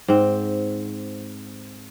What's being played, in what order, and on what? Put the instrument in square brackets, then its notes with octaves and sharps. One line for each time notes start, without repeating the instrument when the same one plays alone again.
[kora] G#2 C4